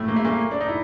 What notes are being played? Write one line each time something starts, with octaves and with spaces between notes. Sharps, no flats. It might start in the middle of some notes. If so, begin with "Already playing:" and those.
Already playing: A2 A3
A#3
A3
A#2 A#3
D4
D#4
E4